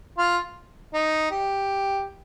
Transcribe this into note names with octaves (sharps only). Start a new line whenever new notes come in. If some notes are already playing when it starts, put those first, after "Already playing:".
F4
D#4
G4